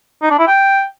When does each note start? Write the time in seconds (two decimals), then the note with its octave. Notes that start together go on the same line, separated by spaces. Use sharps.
0.22 D#4
0.31 D4
0.39 E4
0.47 G5